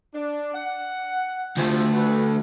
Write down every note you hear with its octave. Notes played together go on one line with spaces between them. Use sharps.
D4
F#5
D2 C3 F3 A3
D4 F#4 B4